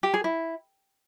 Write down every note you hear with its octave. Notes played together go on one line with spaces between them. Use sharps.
G4
G#4
E4